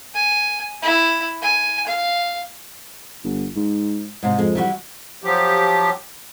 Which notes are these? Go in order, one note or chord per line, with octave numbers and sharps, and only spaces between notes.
G#5
E4
G#5
F5
G1
G#2
G#2 C3
F2 G#3
E3 G3 F#4
F3 F#3 G4